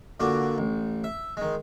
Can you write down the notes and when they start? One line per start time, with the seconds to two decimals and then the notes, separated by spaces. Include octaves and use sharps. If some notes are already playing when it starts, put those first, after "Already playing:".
0.20 A#2 D3 D4 F#4
0.58 A1
1.04 E5
1.37 D#3 G#3